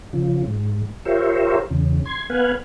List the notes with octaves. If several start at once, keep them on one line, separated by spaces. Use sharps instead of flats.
C#3 F3
G#2
F4 G4 A#4 C5 C#5 E5
E2 C#3
C6 G#6
B3 B4 F5 F#5 G#5